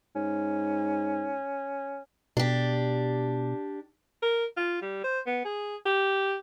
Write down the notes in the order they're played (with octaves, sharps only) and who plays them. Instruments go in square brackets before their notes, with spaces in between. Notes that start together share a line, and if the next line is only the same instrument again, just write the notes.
[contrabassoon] G#2 [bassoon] C#4
[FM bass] B2 [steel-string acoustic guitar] D4 G4
[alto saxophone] A#4
F4
G3
C5
B3
G#4
G4